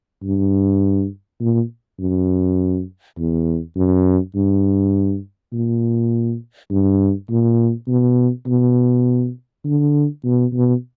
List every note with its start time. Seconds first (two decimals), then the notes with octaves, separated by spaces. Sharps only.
0.23 G2
1.40 A#2
1.99 F#2
3.18 E2
3.77 F#2
4.35 G2
5.53 A#2
6.70 G2
7.30 A#2
7.88 B2
8.47 B2
9.65 D3
10.24 B2
10.53 B2